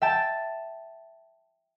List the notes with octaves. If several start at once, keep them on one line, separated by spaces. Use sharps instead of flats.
E5 G5 A5